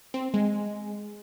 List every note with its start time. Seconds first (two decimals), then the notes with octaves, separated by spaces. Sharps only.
0.14 C4
0.34 G#3